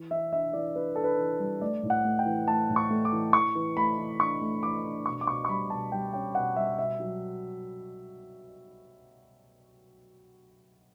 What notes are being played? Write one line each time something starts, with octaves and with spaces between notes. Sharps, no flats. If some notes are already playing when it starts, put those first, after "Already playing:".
Already playing: E3
E3 E5
D4 E5
E3 D5
D4 B4
D4 A4
B4
E3
G3
A3 D5
A2
F#5
A3
G5
E3
A3 A5
A2
C#6
A3
D6
E3
E3 C#6
E3
A3 B5
E3
D4 C#6
A3
E3 D6
D4
B2 C#6
D6
B2 C#6
C#6
G3 B5
B2 A5
G3 G5
C#4 G5
B2 F#5
G3 E5
B2 E5
F#3